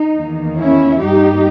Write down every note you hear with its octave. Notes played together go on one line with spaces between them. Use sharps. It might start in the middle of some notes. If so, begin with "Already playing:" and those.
Already playing: D#4
E2 D#3 A#3
C#4 E4
G2 G3 A#3 D#4 G4